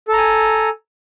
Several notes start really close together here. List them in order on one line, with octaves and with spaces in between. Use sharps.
A4 A#5 G#5